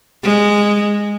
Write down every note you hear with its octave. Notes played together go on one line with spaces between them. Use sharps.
G#3